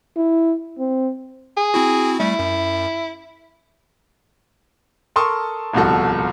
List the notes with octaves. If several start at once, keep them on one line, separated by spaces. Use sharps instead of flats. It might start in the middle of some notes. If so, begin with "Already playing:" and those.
E4
C4
G#4
C4 E4 F#4
G3 A3 E4
F#2
A4 A#4 A5 C6 C#6 D#6
D1 C2 B2 F3 F#4 A4